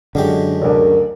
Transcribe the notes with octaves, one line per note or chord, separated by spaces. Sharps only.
F#2 D3 G#3 G4
A1 D2 A#4